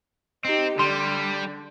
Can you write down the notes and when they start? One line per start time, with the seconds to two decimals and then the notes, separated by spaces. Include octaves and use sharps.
0.45 C4 D#4 G4
0.79 D3 G3 C6